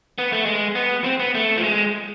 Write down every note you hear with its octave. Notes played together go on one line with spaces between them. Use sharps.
B3
A3
G#3
B3
C4
B3
A3
F3
G#3